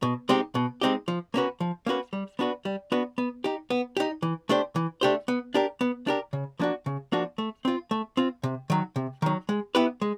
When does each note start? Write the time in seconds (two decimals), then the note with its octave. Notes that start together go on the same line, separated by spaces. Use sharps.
0.03 B2
0.29 G#3 C4 D#4 G4
0.55 B2
0.81 G#3 C4 D#4 G4
1.08 F3
1.34 A#3 C#4 F#4 B4
1.60 F3
1.86 A#3 C#4 F#4 B4
2.13 G3
2.39 B3 D4 F#4 B4
2.65 G3
2.92 B3 D4 F#4 B4
3.18 B3
3.44 D#4 G4
3.70 B3
3.97 D#4 G4
4.22 E3
4.49 A3 D4 G4 C5
4.76 E3
5.01 A3 D4 G4 C5
5.28 B3
5.54 D4 G4 A#4
5.81 B3
6.07 D4 G4 A#4
6.33 C#3
6.59 F3 A#3 D4 F#4
6.86 C#3
7.12 F3 A#3 D4 F#4
7.38 A3
7.65 C4 F4
7.91 A3
8.17 C4 F4
8.43 C3
8.70 D#3 F#3
8.96 C3
9.22 D#3 F#3
9.49 G#3
9.75 B3 E4 G4 B4
10.02 G#3